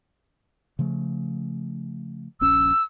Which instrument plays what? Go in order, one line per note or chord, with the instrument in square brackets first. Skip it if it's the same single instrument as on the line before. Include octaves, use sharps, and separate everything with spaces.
[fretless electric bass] C#3 F3 A3
[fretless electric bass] D#1 A#1 C#4 [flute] E6